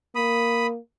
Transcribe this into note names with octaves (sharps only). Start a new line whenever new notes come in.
A#3 B5 D#6